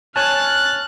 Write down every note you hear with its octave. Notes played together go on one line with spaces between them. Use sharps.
C#5 G#5 A5 F6 F#6 A6